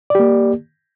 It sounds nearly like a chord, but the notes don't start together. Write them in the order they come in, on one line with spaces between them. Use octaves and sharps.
D5 G4 A#3